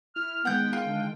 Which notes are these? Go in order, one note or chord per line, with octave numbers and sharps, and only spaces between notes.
E4 F6
D#3 G#3 B3 F#5 G5 G6
F4
D3 D4